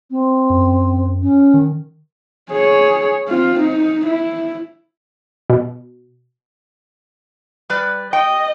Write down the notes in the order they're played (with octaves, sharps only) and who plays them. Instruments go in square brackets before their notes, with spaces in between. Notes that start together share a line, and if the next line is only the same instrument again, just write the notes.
[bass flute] C4
[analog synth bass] F#2
[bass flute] C#4
[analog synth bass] D#3
[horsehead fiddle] G#4 C#5
C4 F4
D#4
E4
[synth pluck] B2
[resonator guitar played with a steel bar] G3 B4 D5
[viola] D#5 [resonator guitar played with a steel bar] G5